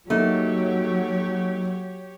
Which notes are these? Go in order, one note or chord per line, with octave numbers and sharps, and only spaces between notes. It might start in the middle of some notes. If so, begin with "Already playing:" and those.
F#3 A3 A#3 D#4 G4 C#5